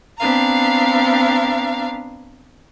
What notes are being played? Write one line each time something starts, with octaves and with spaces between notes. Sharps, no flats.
B3 C4 D4 F5 A#5